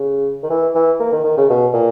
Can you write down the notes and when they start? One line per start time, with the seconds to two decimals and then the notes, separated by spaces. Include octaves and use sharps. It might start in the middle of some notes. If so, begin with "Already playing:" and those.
Already playing: C#3
0.43 D#3
0.50 E3
0.75 E3
1.00 A#3
1.13 D#3
1.24 D#3
1.37 C#3
1.50 B2
1.74 A#2